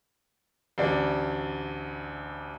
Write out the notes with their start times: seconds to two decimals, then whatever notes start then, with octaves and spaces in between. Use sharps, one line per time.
0.78 A1 D2 D5